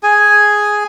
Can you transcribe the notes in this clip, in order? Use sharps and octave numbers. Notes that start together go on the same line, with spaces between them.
G#4 G#5